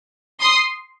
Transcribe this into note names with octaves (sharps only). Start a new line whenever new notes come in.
C6 D#6